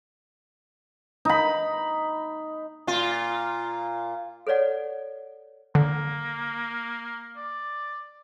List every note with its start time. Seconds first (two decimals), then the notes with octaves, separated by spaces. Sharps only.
1.25 D#4 B5
2.87 A#2 F4
4.47 A4 B4 C#5 D5 F#5
5.75 D3 A#3
7.36 D5